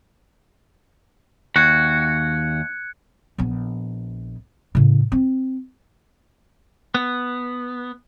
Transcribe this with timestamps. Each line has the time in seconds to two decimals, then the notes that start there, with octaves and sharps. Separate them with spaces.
1.56 D#2 F#4 F#6 G#6 C#7
3.38 A#1 B3
4.75 A2 C#3
5.12 C4
6.95 B3